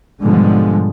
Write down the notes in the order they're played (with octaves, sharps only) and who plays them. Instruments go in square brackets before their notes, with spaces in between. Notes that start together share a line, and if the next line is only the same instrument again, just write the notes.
[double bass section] G#2 B2 D3 F3 G3 G#3